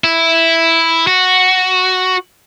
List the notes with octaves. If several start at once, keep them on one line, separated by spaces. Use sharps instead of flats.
E4
F#4